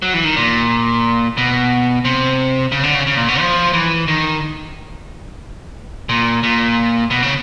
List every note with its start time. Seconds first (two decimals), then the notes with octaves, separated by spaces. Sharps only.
0.02 F#3
0.14 E3
0.24 D#3
0.36 A#2
1.37 B2
2.05 C3
2.72 C#3
2.83 D3
2.95 C#3
3.07 C#3
3.17 A#2
3.28 B2
3.40 F3
3.73 E3
4.08 D#3
6.09 A#2
6.43 A#2
7.10 B2
7.22 C#3